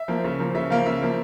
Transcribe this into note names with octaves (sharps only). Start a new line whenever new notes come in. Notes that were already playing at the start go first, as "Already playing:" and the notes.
Already playing: E5
F3 A#3
C#3
F3 A#3
C#3 E5
F3 A#3 F5
C#3 E5
F3 A#3